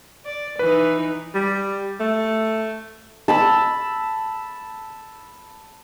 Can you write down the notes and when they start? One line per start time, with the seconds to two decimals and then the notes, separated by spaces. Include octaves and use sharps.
0.25 D5
0.59 E3 D#4 B4
1.35 G3
2.00 A3
3.28 A5 B5 E6